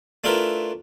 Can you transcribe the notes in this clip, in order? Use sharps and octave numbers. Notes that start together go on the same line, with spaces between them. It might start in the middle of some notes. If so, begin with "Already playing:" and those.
A3 D4 E4 F4 A#4 B4